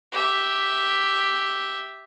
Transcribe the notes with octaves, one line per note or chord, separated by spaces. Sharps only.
G4 E5